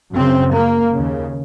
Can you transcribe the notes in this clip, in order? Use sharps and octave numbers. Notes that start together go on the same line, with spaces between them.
F#2 C#3 C4
A#3
D#2 C#3